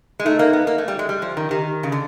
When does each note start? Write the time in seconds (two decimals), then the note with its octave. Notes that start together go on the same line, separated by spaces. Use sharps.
0.19 G#3
0.26 A3 D#4
0.39 A#3
0.53 B3
0.67 A#3
0.78 A3
0.88 G3
0.99 G#3
1.09 G3
1.22 F3
1.37 D#3
1.50 D#3 G4
1.83 C#3
1.92 D3